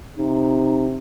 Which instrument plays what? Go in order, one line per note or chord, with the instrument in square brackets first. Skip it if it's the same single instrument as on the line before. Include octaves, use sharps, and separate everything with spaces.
[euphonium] C3 [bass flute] D#4